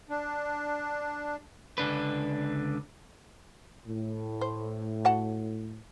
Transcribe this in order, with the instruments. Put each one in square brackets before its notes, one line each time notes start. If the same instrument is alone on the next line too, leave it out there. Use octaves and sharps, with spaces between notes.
[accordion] D4
[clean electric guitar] C#2 D3 D4 B4
[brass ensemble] A2
[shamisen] C5
F#4 F#5 A5